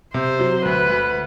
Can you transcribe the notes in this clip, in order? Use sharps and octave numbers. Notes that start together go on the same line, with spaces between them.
C3 C5
F#3
D2 B4
D2